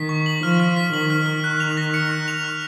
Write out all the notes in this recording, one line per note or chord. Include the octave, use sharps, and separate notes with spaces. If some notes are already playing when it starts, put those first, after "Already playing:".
Already playing: D#3 B6
C#6
F#7
F3 F6
F6
B6
D#3 F#7
F6
F6
F#6
F7
A#6
C#7
F#6
F7
F6